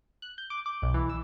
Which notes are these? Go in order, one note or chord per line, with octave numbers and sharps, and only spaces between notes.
F#6
G6
D6
D6
B1
E3
E6